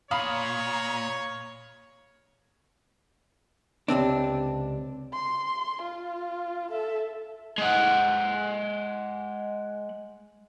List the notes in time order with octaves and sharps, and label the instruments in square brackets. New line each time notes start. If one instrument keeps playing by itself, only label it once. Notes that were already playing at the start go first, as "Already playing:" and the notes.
[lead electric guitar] A#2 [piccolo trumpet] C#5 [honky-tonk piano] F5 B5 D#6
[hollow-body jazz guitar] C#2 C3 C4 D4
[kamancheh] C6
F4
A4 E5
[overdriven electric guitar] G#3 F#5